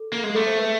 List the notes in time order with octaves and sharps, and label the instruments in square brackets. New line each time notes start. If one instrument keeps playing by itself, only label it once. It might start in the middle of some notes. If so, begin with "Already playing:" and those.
Already playing: [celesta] A4
[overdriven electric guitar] A#3
G#3
[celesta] G#4
[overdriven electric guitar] A3 [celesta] A4
[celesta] C5
B4